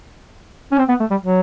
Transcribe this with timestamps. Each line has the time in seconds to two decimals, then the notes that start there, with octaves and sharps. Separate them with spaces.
0.72 C#4
0.78 C4
0.89 B3
1.00 A3
1.10 G3
1.21 F#3